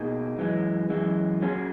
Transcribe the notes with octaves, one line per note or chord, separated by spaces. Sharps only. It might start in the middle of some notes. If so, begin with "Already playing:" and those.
Already playing: B2 A#3 D#4 G#4
F#2 E3 G#3
F#2 E3 G#3
A#2 F#3 C#4 G#4